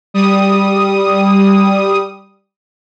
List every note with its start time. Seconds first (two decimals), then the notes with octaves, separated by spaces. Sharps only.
0.14 G3 D#6